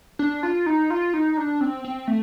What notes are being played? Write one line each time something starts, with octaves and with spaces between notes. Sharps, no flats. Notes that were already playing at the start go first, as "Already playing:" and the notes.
D4
F4
D#4
F4
D#4
D4
C4
C4
A3